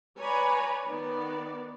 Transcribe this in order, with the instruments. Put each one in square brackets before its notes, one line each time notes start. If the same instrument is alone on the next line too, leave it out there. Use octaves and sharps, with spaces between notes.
[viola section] B4 C#5 D5 G#5 A#5 B5
D#3 B3 D5